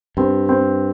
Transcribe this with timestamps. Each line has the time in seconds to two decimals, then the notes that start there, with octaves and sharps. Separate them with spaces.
0.17 G2 C4
0.49 C4